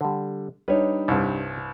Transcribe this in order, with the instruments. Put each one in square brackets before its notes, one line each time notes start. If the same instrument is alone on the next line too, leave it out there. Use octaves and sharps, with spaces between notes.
[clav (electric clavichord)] D3 G3
[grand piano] G3 D4 D#4 [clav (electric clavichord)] B4 C#5
[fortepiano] C2 G2